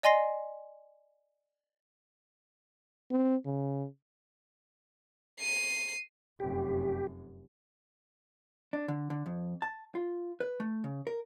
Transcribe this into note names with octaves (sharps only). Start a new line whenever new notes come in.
D5 D#5 G#5 C6 A#6 C7
C4
C#3
C7 D#7
F1 F#2 G4
D4
D3
D3
F2
A5
F4
B4
A3
C#3
A#4